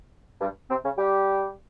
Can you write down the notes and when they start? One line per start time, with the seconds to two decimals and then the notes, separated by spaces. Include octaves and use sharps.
0.41 G2 G3
0.69 C3 C4
0.83 C#3 C#4
0.97 G3 G4